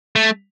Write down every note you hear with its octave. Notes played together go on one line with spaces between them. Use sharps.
A3